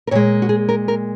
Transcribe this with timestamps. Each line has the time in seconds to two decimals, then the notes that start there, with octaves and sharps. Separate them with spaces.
0.07 A#4
0.11 A#2 G#3 C#5
0.42 F#4
0.49 G#4
0.69 A#4
0.88 A#4